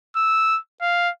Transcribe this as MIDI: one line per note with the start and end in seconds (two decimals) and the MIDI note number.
0.16 0.58 88
0.82 1.09 77